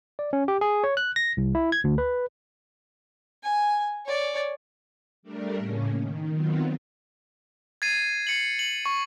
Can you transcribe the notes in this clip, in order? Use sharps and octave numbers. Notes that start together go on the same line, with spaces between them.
D5
C#4
G4
G#4
C#5
F#6
A#6
C2
E4
G#6
D2
B4
G#5
C#5 D5
G3 A3 D4 A#4
A2 C#3 A#3 C#4
D#3
D#3 F#3 B3 C4 F4
G#6 A6 C7 D#7
C7 C#7 F#7
F#7
C#6